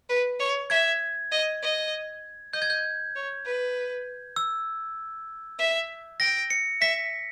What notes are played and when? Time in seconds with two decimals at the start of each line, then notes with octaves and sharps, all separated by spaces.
0.09 B4
0.39 C#5
0.70 E5 G#6
1.31 D#5
1.62 D#5
2.53 D#5 G6
2.62 G#6
2.70 G6
3.15 C#5
3.46 B4
4.36 E6
5.59 E5
6.20 G5 A#6
6.50 C#7
6.81 E5 B6